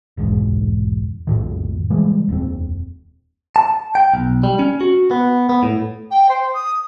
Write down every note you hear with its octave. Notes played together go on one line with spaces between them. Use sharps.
F1 B1 E2 G#2
B1 F2 A2 D#3
C#3 E3 G3 G#3
D#1 F2 C4
A5
G5
B1
G3
C#4
F#4
B3
B3
A2
G5
C5
D#6